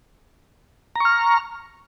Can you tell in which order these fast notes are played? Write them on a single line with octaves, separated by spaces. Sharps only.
A#5 C#6 F6